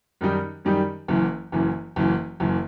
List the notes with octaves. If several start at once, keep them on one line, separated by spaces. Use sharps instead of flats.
F#2 D#3 G3 D#4 G4
F#2 D#3 G3 D#4 G4
F#1 F#2 E3
F#1 F#2 E3
F#1 F#2 E3
F#1 F#2 E3